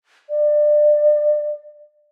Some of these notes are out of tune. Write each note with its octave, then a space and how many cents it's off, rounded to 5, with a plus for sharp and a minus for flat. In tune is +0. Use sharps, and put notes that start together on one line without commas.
D5 +25